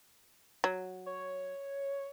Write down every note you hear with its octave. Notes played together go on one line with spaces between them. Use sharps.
F#3
C#5